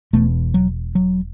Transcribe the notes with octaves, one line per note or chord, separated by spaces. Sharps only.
E1 E2 B2 A3
F#3
F#3